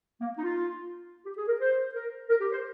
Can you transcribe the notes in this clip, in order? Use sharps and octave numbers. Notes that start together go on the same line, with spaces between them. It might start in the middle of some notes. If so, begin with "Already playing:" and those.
A#3
D#4
F4
G4
G#4
A#4
C5
A#4
A#4
G4
C5